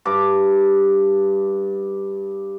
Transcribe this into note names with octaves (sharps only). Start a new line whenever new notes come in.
G2 D6